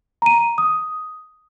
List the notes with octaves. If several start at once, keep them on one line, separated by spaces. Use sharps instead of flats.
A#5 D#7
D#6